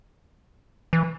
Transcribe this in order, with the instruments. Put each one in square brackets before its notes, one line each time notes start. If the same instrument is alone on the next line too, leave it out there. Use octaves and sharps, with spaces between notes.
[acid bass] E3